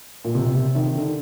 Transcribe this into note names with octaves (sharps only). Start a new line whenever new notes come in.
A#2
C3
C3
D#3
D3